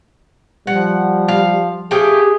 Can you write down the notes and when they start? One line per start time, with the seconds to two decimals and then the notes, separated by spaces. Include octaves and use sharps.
0.67 F3 G3 F#5
1.28 F5
1.91 F3 A3 G4 G#4